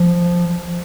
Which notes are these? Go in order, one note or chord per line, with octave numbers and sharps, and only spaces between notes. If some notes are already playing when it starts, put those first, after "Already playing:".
Already playing: F3